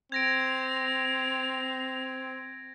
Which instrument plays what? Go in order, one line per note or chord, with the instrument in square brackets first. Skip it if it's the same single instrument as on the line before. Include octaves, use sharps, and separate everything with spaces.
[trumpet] C4 [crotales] G#6 A#6 D7 [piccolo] F7